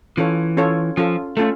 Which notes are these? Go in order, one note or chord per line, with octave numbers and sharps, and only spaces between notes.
E3 C#4 F4 A4 C#5
C#4 F4 A4 C#5
F3 C#4 F4 A4
A3 C#4 F4 A4